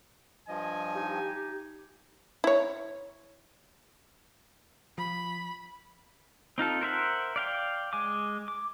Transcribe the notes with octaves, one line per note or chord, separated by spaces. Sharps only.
G2 F3 D#5 G#5
D#4 G4
E4 C#5
F3 B5
C4 D#4 F4 A4
A#4 C5 E5 F#5
D5 F5 G5
G#3 G#5 D6
D6